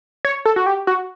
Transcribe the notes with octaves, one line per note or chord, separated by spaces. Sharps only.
C#5
A4
F#4
G4
F#4